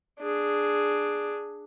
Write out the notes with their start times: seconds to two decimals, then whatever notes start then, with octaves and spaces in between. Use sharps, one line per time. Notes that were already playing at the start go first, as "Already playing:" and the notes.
0.20 D4 G#4